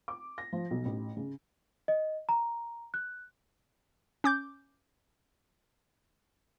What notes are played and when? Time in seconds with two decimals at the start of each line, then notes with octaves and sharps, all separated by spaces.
0.08 D6
0.38 A#6
0.53 F3
0.71 B1
0.85 A1
1.17 C#3
1.88 D#5
2.29 A#5
2.94 F#6
4.24 C#4 D6 G6